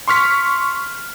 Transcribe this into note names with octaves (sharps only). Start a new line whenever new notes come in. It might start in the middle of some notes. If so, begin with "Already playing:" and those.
C6 C#6 F6 B6